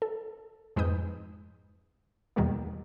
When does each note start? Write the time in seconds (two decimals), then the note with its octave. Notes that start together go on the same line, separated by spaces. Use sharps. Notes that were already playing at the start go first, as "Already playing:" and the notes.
0.02 A4
0.76 F2 G#2 D#4 B4 D#6 G6
2.36 E2 B2 D#3 G3 G#3 A#3